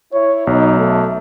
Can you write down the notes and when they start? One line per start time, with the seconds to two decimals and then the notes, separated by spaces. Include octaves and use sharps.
0.13 E4 C#5
0.47 B1 D#4
0.76 A3